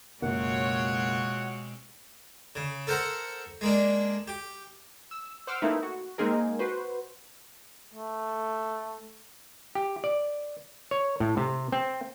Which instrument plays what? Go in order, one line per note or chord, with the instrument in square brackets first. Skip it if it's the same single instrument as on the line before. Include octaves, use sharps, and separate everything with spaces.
[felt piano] F#1 [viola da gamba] B2 G#3 C4 [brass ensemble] F4 F#4 C#5 [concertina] F#5
[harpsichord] C#3
A4 A#4 C5 F#5 A#5
G#3 A#3 D4
G4
[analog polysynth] E6
C5 F#5 D6 E6 F6
A3 A#3 C4 D#4 E4 B4
F#4
G#3 A#3 C4 D#4 G#4 A#4
F#4 B4 C5
[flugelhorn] A3
[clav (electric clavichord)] G4
D5
C#5
A2
C3
C4